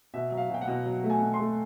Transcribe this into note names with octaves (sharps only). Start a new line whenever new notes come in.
B2 E5
F#3
F5
B2 G5
F#5
B2
F#3
A3
G#5
B2
C6
A3